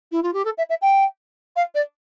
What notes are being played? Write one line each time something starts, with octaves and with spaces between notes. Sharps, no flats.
E4
F4
G4
A4
E5
E5
G5
F5
D5